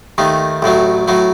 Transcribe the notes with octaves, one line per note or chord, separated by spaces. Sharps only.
D#2 D#3 A3
A1 A2 F#3 A3
A2 F#3 A3